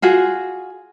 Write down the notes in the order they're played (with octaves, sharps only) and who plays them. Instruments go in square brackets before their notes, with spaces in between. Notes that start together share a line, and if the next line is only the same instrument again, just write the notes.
[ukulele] F4 F#4 G#4